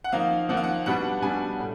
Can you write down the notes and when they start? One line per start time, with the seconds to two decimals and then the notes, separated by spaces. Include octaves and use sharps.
0.04 F#5
0.12 F3 A#3 D#4 F5
0.49 F3 A#3 D#4 F#5
0.57 F5
0.64 F#5
0.86 B2 G3 B3 D4 F#5
1.22 B2 G3 B3 D4 G#5
1.59 A2